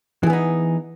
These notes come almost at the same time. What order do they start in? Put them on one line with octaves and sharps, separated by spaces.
E3 G#4 B3 D#4